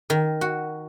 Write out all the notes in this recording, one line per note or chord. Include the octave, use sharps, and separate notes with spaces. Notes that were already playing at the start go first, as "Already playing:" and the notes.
D#3
F#4